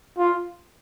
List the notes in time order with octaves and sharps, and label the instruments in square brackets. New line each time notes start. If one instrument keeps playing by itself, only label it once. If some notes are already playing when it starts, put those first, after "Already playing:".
[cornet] F4